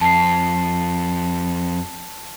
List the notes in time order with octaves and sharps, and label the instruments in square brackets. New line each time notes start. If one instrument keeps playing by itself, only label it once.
[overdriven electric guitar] F2 [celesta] A5 C7